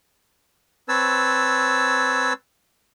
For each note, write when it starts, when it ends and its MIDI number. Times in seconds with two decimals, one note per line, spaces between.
0.89 2.33 60
0.89 2.33 71
0.89 2.33 73
0.89 2.33 81
0.89 2.33 88